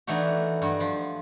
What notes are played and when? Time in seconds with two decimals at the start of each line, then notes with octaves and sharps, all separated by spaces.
0.07 E3 A3 D4 D#4 F#4
0.62 G2 F#4
0.80 F3